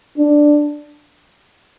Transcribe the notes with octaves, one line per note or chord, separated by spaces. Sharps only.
D4